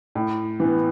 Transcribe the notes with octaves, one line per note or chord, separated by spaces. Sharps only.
A2
E3 B3